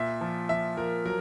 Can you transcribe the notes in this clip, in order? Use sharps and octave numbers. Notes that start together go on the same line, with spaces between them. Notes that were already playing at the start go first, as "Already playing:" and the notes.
Already playing: A#2 E5
F3
F3 E5
F3 A#4
F#3 A#4